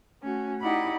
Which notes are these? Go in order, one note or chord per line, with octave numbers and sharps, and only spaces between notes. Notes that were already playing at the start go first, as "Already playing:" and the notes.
A3 C#4 F#4
D#4 E4 G4 D5 F#5 B5